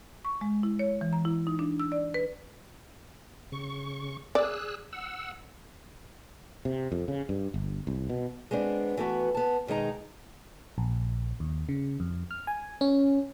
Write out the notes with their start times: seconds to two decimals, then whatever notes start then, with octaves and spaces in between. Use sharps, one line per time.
0.25 C#6
0.41 G#3
0.63 E4
0.79 C#5
1.01 E3
1.13 A#5
1.25 E4
1.47 D#4
1.59 D4
1.80 E6
1.92 D5
2.14 B4
3.52 C#3 C#6
4.35 G#4 D5 E6 F#6
4.93 F#5 E6
6.65 C3
6.92 F2
7.08 C#3
7.29 G2
7.54 G1
7.87 C2
8.09 B2
8.51 G#3 B3 C4 D4
8.97 E3 A3 B3 F#4
9.35 B3 A5
9.67 B2 D#3 G#3 D#4 A#5
10.78 A#1
11.40 D#2
11.69 C#3
12.00 F2
12.31 F6
12.47 G#5
12.81 C#4